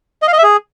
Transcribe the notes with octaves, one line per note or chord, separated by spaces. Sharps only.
D#5
F5
D#5
E5
G#4